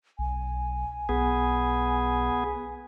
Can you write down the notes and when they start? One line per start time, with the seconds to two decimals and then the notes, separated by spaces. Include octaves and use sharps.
0.19 B1 G#5
1.09 B1 B3 G#4